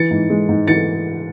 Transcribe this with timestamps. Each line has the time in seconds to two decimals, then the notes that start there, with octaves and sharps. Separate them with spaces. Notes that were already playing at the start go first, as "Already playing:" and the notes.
Already playing: E3 A6 C#7
0.11 G#2
0.30 G#3
0.49 G#2
0.67 E3 A6 C#7